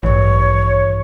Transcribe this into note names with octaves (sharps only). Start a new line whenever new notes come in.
A1 G2 E3 C#5